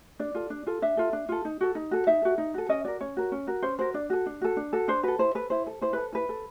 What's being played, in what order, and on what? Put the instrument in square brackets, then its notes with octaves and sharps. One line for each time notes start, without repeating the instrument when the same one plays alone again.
[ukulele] D4 D5
F4 A4
D4
F4 A4
D4 E5
F4 A4
D4
F4 A4
D#4
F#4 A4
D#4
F#4 A4
D#4 E5
F#4 A4
D#4
F#4 A4
C#4 D#5
F#4 A#4 D5
C#4 C#5
F#4 A#4
C#4
F#4 A#4
C#4 C5
F#4 A#4 C5
D4 D5
F#4 A4
D4
F#4 A4
D4
F#4 A4
D4 C5
F#4 A4 B4
E4 C5
A4 B4
E4 C5
A4
E4 C5
A4 B4
E4 B4
A4